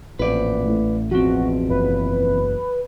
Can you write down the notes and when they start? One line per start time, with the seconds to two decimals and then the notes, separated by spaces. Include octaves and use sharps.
0.19 A1 A#2 F3 C4 B4 D5
0.65 A2
1.11 E2 B2 F3 C4 F#4
1.69 F#1 B4